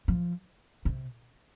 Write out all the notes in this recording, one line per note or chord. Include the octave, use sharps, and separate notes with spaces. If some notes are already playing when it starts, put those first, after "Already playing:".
F3
C3